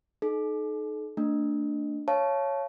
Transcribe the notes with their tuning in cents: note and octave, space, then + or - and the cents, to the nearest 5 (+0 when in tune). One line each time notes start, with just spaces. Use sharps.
D#4 -15 A4 -40
A3 +30 D4 +0
C#5 +0 F5 -30 A5 -15